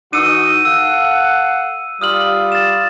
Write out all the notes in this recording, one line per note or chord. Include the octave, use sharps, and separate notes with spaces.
E3 D#4 F#4 E6 C#7 D#7
A4 F5 F#5 E6
G3 F4 D#6 F6 F#7
A6 E7